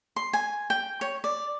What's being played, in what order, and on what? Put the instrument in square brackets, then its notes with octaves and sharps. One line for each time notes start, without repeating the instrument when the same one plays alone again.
[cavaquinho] C6
G#5
G5
C#5
D5